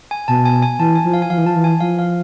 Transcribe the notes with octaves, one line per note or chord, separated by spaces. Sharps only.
G#5
B2 A5
G#5
G#5
E3 A5
G#5
F3
F5
G#5
F3 F5
E3
F3 A5
E3
G#5
F3 F5
F5